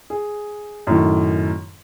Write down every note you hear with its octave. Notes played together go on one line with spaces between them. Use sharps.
G#4
F#2 A2 D#3